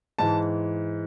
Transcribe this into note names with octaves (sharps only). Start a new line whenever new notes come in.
G#2 E3 A5